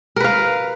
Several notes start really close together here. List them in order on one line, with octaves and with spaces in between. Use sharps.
A#4 B4 F5